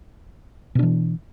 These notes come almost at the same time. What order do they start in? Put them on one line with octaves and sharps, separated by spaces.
B2 D4 E3